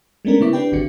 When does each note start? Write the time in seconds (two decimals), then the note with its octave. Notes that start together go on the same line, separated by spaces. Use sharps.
0.25 G#3 A3 B3 C#4 D4 A#4
0.40 C#3 B3 E4 D6 B6
0.53 C4 D4 G4 B4 G5
0.72 G#1 D3 F#4 C#7